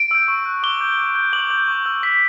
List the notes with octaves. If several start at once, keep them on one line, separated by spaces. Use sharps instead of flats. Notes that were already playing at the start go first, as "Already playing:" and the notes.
Already playing: D7
E6 G6
C#6
F#6
D6 G7
G6
D6
G6
D6 F#7
G6
C#6
E6 G6
C#6 B6